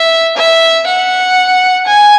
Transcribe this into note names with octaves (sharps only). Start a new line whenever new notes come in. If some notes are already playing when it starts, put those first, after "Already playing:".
Already playing: E5
E5
F#5
G#5